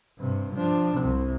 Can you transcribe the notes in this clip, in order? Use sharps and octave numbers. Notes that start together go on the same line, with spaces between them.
G2 C3
F3 D4
C2 C3